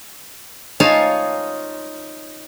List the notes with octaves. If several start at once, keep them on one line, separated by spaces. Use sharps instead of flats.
D#4 F4 C#5 F5 G#5 A5